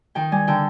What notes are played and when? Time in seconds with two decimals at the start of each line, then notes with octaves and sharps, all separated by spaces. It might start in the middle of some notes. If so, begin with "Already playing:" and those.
0.15 D#3 G5
0.32 G3 G#5
0.47 D3 G5